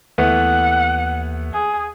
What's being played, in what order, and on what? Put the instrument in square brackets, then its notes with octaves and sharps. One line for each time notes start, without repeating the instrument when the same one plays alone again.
[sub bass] D#2 [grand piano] E3 A3 B3 [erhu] F#5
[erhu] G#4